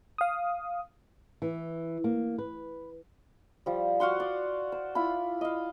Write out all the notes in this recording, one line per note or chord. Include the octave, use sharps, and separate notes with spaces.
F5 D#6
E3
A#3
B4
F3 G3
F#4 F5 F#5 C6
D5
C5
E4 F4 B5
D#5 F5